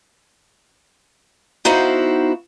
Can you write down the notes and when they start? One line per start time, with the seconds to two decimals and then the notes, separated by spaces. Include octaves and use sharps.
1.65 B3 D#4 E4 F#4 C5 F5